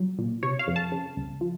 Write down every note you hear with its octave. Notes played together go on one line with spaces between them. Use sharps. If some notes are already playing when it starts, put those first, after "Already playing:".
Already playing: F#3
A#2
C3 C#5
F5
F2
A5
C#3
C#2
F3